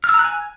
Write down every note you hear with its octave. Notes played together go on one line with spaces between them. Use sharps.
F6
E6
A#5
F#6
G#5